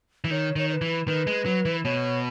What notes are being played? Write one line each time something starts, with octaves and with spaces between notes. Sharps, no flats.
E3
D#3 C#5
D#3 C#5
C#5
B4
E3
D#3 B4
G#3
F#3
E3
B2 C#5